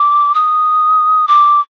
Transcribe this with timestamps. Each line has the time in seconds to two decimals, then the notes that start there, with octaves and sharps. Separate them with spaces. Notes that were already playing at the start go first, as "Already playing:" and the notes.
Already playing: D6
0.34 D#6
1.28 D6